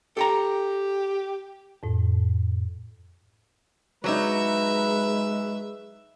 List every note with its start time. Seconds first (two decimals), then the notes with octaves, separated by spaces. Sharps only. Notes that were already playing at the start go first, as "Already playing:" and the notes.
0.17 G4 A4 G5 A#5
1.83 F2 A2
4.04 F#3 G#3 D#4 B4 E5